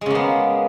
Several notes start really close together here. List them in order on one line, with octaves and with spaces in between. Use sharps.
G#3 C#3 A#3 B3